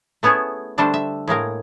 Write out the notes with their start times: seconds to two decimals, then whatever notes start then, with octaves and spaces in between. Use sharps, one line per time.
0.23 A3 B3 C#4 E4 G#4
0.78 D3 G3 A3 D4 A4 C5
0.94 E5
1.28 A2 G#3 A#3 A#4